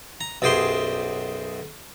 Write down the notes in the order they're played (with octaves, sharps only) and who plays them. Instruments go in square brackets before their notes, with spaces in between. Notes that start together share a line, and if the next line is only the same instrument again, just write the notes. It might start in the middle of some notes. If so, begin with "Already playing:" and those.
[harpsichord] A#5
B1 F#2 G4 G#4 C5 C6